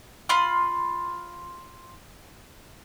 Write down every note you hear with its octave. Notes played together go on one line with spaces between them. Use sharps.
F4 B5 C6